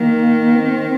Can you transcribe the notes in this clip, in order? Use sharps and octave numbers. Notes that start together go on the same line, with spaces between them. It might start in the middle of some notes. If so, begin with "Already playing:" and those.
Already playing: D#3 A#3
C4